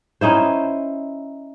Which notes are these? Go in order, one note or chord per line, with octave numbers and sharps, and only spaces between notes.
C#4 D#4 E4 C5